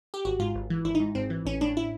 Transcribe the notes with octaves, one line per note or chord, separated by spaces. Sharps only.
G4
G#1 F#4
G#2 F4
G#1
E3
G#1 E4
D#4
G#2
G#1 C4
E3
A1 C#4
A2 D4
E4